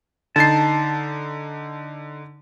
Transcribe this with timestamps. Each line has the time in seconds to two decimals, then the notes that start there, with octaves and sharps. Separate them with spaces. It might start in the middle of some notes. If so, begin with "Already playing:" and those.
0.36 D3 D#4 A5 C7